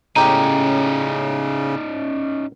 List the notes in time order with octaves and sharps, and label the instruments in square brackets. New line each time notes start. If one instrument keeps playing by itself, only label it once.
[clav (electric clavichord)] A2 G4 [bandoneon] C#3 [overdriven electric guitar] C#4 D#4 [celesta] A#5